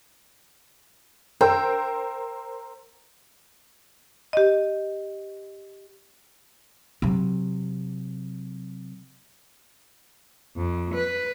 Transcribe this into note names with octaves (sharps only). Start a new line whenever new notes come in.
A#4 C5 G5 E6
G4 D#5
C3 F#3
F2
B4